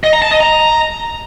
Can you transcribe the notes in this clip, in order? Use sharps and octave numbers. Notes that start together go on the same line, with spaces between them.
D#5
A#5
A5
D#5
A#5